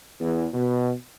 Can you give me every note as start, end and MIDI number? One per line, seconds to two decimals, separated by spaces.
0.20 0.46 40
0.53 0.92 47